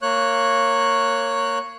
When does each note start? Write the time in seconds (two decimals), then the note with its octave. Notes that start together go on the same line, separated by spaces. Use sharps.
0.02 A#3 C#5 F#6